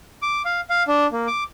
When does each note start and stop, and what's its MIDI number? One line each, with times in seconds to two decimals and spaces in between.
0.22 0.42 86
0.45 0.60 77
0.70 0.83 77
0.88 1.07 62
1.12 1.27 58
1.27 1.44 86